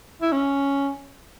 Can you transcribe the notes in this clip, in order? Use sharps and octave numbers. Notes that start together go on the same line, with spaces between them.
E4
C#4